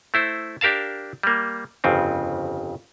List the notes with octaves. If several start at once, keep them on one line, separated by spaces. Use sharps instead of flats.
A3 E4 C5
D4 G4 A#4 F5 A5
G3 A#3
G1 F2 C#3 C4